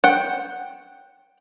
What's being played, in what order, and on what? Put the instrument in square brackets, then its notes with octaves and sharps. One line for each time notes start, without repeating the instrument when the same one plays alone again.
[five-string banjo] F#5 G5